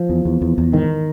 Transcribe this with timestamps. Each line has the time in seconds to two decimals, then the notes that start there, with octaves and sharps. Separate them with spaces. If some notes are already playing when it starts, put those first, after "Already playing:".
Already playing: F3
0.09 E2
0.25 E2
0.42 E2
0.58 E2
0.73 G#2 D#3